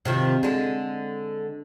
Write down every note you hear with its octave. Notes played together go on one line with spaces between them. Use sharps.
C3 D#3 F3
D3 G#3